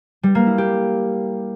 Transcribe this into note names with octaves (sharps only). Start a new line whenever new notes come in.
G3
A#3
E4
G4